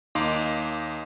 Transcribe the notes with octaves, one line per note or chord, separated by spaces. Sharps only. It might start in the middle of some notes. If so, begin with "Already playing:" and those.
D#2 D#4 F5 C6 D6